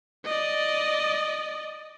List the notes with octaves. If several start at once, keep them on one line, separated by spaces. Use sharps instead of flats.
D5 D#5